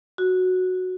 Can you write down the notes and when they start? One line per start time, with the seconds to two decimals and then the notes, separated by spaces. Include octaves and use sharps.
0.18 F#4